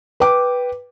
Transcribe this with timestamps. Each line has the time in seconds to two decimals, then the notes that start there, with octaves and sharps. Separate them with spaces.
0.20 B4 G5 D6